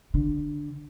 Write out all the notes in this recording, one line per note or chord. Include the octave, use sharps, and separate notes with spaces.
D3